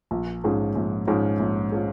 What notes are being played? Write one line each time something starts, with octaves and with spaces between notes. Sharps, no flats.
A#1
G#2 F3 C#4 G#4
A#1
G#2 F3 C#4 G#4
A#1
F3 C#4 G#4